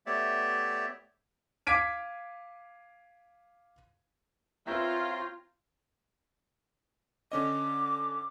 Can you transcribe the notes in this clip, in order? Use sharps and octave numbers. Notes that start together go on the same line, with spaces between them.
A3 B3 G4 C#5 D5 E5
F5 D6 G#6 B6 D7 D#7
C4 F4 B4 C#5 E5 G5 A#5
D3 C#4 D#5 D6